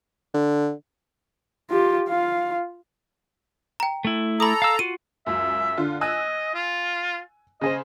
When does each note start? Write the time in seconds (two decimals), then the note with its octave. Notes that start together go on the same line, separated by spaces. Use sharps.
0.34 D3
1.71 F4 G4
2.09 F4 F5
3.80 G5 A#5
4.05 A3 E4
4.40 A4 A#5 B5 D6 D#6
4.62 F5 E6
4.79 F4 F#4 D#7
5.27 C#2 F#2 E5
5.77 D3 F4
6.01 D#5 G#5 E6 F#6
6.54 F4
7.61 C#3 G#4 C5 D#5